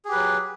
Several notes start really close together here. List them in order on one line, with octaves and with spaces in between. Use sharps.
G#4 G4 B4 F#3